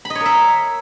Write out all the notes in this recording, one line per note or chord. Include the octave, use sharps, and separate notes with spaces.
B5
D#5
C#5
A#4
E5